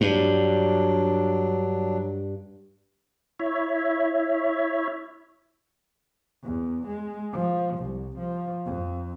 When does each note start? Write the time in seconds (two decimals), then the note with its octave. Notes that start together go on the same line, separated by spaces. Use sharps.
0.01 G2 F#3 D4
3.40 E4 C#5 E5
6.43 E2
6.87 G#3
7.33 F3
7.78 C2
8.18 F3
8.66 F2